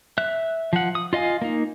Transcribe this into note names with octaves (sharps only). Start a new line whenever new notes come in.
E5 F#6
F3 F#5
D#6
F4 D#5 F5 G#5
A#3 D#4